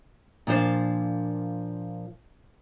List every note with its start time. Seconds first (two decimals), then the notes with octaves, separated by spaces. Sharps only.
0.47 A#2 F3 D4 C5 F5